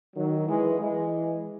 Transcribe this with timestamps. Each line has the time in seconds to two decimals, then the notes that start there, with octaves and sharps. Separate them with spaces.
0.15 D#3 F#3
0.47 E3 G#3
0.79 E3 G#3